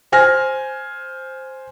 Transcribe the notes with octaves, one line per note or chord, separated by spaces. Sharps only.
C5 G#5 F6 A#6